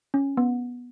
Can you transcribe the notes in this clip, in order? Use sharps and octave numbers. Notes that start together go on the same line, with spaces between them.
C#4
B3